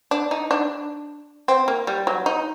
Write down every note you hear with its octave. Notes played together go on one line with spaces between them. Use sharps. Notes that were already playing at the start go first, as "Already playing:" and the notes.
D4
D#4
D4
C4
A#3
G3
F#3
D#4